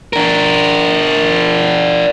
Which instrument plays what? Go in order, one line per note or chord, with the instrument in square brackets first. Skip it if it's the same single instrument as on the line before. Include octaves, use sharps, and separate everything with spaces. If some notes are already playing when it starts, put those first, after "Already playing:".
[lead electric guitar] D4 A#4